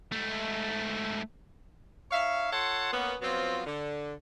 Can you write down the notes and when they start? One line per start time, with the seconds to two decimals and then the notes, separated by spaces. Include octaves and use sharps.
0.12 G#2 A3
2.11 D#4 C#5 E5 F5
2.53 F4 A4 C#5 F#5 A5 C6
2.93 A#3 B3 C#4
3.21 F3 F#3 B3 C4 F4
3.66 D3